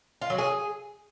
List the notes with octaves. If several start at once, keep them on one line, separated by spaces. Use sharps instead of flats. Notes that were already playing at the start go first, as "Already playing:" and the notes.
F4
F#3
G#4